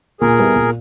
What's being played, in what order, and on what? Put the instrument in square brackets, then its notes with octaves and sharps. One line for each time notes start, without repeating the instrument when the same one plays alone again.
[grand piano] A#2 [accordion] G#4 A#4
[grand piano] G3 B3 E4
A#2